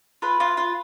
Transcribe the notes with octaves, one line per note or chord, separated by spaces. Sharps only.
F4 B4
F4
F4